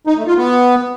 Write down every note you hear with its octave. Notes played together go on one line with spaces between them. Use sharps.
D#4
A3
F4
B3